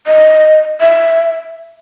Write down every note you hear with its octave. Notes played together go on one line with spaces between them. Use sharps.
D#5
E5